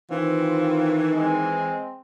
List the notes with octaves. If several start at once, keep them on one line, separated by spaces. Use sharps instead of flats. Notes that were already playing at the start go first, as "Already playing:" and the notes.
D#3 E3 C4 F4
G#3 C4